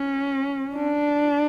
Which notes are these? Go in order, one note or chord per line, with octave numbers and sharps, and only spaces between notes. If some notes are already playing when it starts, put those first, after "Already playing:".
Already playing: C#4
D4